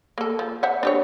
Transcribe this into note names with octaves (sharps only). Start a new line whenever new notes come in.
A#3 A4
F3
C5 E5 F#5
D4 G4 C#5